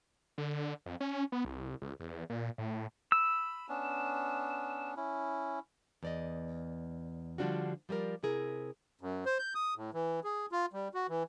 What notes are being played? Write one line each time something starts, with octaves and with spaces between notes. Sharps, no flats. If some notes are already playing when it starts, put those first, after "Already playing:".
D3
F2
C#4
B3
C2
C#2
E2
A#2
A2
B5 E6
B3 C#4 D4
C#4 E4
E2 D5 D#5
D3 F3 G3 D4 F4 F#4
F3 G3 G#4 A#4 D5
C3 E4 G#4 A#4
F#2
C5
G6
D#6
A2
E3
G#4
F4
G3
F#4
E3